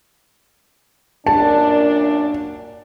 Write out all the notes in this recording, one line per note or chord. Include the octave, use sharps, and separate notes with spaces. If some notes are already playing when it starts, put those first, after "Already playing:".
F#2 A#2 D4 A5